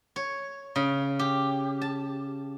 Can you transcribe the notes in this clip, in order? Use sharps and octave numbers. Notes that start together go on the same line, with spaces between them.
C#5
C#3
G4
A5